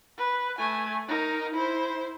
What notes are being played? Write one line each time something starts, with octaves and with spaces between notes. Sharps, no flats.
B4
A3 G#5
D#4 A#4
E4 C5